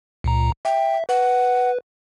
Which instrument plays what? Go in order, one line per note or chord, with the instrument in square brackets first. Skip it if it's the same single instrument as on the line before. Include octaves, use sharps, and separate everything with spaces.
[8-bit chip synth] C#2 A#2 A#5
[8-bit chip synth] E5 [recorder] G5
[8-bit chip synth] B4 [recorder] F#5